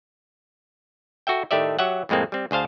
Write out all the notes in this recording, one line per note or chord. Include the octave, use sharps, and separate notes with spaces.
F#4 A4 E5 G5
A2 D#3 A3 G4 D5 E5
F#3 G4 E5 F#5
F2 A2 G#3 A#3 C4
G3 C4
D2 G#4 C5 F5 A5